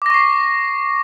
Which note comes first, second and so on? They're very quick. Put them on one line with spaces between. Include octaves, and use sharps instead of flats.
D6 A#6 C#6 C7